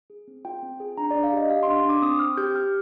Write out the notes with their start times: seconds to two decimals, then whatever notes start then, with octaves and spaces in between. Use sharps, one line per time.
0.10 G#4
0.28 C4
0.45 F4 G5
0.63 C4
0.80 G#4
0.97 D4 A#5
1.11 D5
1.15 D4
1.23 F5
1.33 G4 D#5
1.50 G4 F5
1.63 C6
1.67 D4
1.76 C6
1.85 D4 D6
2.02 C4 D#6
2.19 C4 F6
2.37 G4 G6
2.55 G4 F6